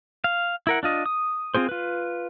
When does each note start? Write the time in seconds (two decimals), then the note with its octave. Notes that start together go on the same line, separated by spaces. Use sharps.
0.24 F5
0.67 E4 A#4 F#5
0.83 D4 F4 D#5
1.06 D#6
1.55 C4 F4 G#4 C5
1.69 F4 B4